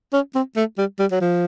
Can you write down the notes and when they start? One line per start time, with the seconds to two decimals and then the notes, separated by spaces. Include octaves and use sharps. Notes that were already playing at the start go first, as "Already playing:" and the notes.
0.13 C#4
0.35 C4
0.56 A3
0.78 G3
0.99 G3
1.11 F#3
1.21 F3